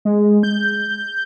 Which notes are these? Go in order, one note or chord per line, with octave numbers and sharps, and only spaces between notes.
G#3
G6